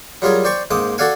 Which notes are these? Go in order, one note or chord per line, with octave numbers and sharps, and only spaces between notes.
F#3 G3 F4 G#4 A#4
C5 D5 G5 C6 C#6
G#2 A#3 C4 D6 D#6
F#4 A4 D5 F5 F#5 G#5